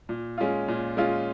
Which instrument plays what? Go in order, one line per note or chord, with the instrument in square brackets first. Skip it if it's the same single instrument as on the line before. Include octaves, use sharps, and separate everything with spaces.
[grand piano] A#2
G#3 C#4 F4
A#2
G#3 C#4 F4